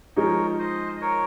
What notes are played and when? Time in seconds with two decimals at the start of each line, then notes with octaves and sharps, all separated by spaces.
0.16 F3 G#3 D#4 A#4 C#5
0.59 C5 D#5
0.97 D#5
1.01 A#4 C#5